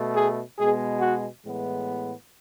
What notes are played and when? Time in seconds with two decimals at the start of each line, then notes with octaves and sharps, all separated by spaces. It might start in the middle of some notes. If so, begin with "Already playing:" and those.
Already playing: B2 A3
0.15 G#4
0.58 B2 G#3 B3 G#4
1.01 F#4
1.44 A2 E3 G#3 B3